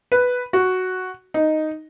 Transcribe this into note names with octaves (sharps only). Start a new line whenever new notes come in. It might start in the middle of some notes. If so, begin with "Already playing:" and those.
B4
F#4
D#4